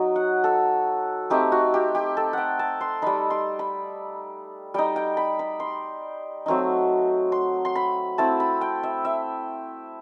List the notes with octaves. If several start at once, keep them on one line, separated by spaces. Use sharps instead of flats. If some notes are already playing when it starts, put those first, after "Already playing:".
Already playing: F#3 D#4
F#5
A4
A3 C4 D#4 G4
F#4
G4
G4
A4
F#5 G5
A5
C6
G3 D#4 B5
C6
B5
G3 D#4 G5
G5
B5
B5
C6
F#3 A3 C4 D#4
C6
C6
B5
A3 C4 E4 A5
B5
G5
E5
E5